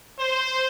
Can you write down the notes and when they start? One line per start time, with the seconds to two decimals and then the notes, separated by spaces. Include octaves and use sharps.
0.19 C5